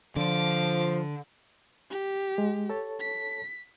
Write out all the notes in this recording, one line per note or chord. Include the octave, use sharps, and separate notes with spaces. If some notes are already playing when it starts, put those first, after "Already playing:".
D3 F3 D6
G4
G#3
A4 C#5 A5
B6